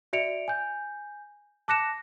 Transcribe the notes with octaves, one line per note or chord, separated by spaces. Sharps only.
F#4 D5 E5 C#7 D7 F7
G#5 G6
A5 D6 F#6 A#6 C#7 E7